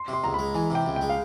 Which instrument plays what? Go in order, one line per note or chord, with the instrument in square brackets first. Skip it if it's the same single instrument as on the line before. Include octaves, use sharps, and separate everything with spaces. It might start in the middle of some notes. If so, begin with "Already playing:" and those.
Already playing: [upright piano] C6
[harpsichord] C3
[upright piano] C6
[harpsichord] C#2 [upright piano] A#5
[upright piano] B5
[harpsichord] G#3
[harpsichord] E3 [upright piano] G#5
[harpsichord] C3 [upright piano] G5
[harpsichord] C#2
[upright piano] G5
[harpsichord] G#3
[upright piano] F5